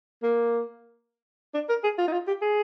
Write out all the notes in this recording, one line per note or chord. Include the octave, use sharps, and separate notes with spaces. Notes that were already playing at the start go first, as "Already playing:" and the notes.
A#3
D4
A#4
G#4
F4
D#4
F4
G4
G#4